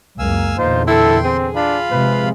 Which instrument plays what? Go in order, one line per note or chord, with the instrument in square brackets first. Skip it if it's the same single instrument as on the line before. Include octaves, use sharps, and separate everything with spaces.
[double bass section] C#2 F#2 A#3 [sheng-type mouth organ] F5 G#5 E6
[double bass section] E2 A#2 D3 [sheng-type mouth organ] D#4 F4 [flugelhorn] C5
[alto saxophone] E4 [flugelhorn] A4 [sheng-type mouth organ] G5 C6
[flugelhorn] C4 [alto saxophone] G#4
[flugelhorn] D4 [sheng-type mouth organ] F4 F5 B5
[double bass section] C3 F3 G#3 [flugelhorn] B4